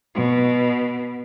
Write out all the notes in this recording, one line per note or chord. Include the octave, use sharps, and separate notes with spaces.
B2